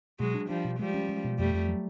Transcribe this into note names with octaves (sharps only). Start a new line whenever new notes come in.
B2 F#3 G#3
D4
F3 G3 D4
B2
F3 G3 G#3
C#4
G#3
B2
F2 G3 A3
F2
F#3